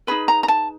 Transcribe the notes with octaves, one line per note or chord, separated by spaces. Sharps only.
D#4 G#4 B4 B5
A#5
A#5
A5